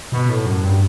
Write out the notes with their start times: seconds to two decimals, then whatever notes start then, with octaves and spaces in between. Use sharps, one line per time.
0.12 B2
0.29 A2
0.46 F#2
0.63 G2